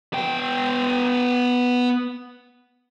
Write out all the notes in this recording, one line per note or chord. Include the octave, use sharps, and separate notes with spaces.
B3 G5